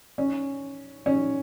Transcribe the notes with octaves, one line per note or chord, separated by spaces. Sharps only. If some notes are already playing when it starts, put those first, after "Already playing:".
C#4
C#4